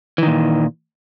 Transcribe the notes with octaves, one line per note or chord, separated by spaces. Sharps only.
A#2 D#3 E3